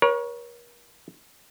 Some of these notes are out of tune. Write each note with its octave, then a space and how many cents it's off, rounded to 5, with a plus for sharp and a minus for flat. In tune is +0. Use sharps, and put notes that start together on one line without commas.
A#4 +40 C#5 +0